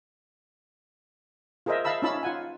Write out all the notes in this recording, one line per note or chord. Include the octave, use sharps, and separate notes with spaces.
F4 G#4 A#4 C5 D#5 E5
E5 F5 A5 B5 E6
C#4 D#4 F4 A5 B5 E6
F4 F#5 G#5